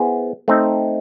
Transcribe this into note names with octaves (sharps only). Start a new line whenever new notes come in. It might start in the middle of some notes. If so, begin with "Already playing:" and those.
Already playing: B3 E4 G#4 C5
A3 C4 D#4